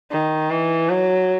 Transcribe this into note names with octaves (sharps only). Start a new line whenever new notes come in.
D#3
E3
F#3